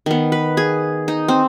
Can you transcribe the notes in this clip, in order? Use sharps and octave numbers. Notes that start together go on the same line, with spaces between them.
D#3 B3
B4
G#4
D#4
C4